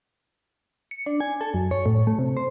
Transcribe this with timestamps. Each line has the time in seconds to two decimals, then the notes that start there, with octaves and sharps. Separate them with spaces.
0.91 C#7
1.06 D4
1.20 G#5
1.41 A4
1.54 F#2
1.71 C#5
1.86 A2
2.07 A3
2.19 C3
2.37 C5